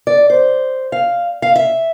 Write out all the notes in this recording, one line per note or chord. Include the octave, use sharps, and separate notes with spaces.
D5
C5
F5
F5
E5